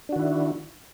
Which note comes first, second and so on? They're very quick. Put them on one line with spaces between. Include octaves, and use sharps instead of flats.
D4 F#4 D#3 E4